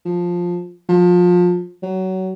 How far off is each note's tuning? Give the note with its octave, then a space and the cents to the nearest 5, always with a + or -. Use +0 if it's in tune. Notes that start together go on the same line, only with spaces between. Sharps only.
F3 +10
F3 +25
F#3 +25